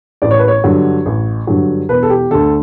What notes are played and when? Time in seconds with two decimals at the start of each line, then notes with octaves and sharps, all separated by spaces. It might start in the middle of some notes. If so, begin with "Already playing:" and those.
0.22 A1 D5
0.31 C#5
0.39 B4
0.48 C#5
0.64 G2 D3 F#3
1.06 A1
1.47 G2 D3 F#3
1.89 E1 B4
2.03 A4
2.10 G4
2.31 D2 D3 A4